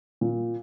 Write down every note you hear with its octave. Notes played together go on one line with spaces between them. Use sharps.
A#2